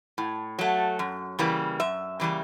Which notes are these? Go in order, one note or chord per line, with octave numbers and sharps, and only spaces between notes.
A2
F#3 A3
F#2
C#3 E3 G3 A#3
F#2 E5
C#3 E3 G3 A#3